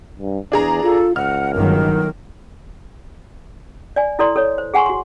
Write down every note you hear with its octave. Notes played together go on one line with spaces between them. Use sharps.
G2
E2 D4 G#4 A#5
F4 A4
C#2 F#5 F6
G1 D#3 F#3 A#4
D5 G#5
E4 A4 D5 C6
A4 C#5
C5
G#4 F#5 G#5 C6 C#6
F#4 C6